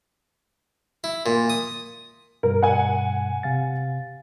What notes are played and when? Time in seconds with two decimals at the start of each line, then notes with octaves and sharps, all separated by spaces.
1.04 E4
1.26 A#2
1.50 D#6
2.43 G2 B2 G3 A#4
2.63 F#5 G#5
3.43 C3 F5 A6